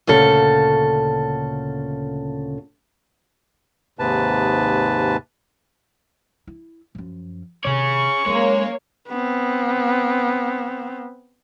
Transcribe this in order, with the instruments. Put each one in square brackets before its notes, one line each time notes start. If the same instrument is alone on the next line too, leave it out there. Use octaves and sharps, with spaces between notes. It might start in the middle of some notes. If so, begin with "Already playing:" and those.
[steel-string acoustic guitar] D2 A#2 C#3 A4
[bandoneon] D#2 G#2 C3 B4 A5
[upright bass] E4
F#2 F3
[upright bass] C3 D#3 [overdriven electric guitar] G#4 C#5 [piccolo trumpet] C#6
[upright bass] F#3 C#4 [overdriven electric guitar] G#3 [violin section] A#3 C#5
[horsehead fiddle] B3 C4